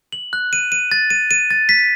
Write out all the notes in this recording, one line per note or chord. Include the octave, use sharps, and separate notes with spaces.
F#7
F#6
D#7
D#7
A6
D#7
D#7
A6
B6